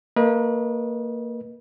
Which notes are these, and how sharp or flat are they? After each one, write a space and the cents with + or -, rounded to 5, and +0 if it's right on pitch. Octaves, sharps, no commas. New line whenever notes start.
A#3 -20 B4 -35 D#5 +0